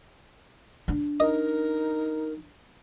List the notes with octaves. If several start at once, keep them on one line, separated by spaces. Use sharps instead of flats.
D4
D#4 A#4 D#5